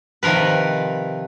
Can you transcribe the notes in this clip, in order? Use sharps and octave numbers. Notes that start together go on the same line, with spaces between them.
C3 D#3 F3 A#4 B4